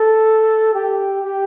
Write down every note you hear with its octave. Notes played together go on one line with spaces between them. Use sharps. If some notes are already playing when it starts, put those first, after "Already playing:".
Already playing: A4
G4
G4